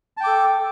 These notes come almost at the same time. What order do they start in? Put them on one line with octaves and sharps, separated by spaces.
A5 G5 D6 A4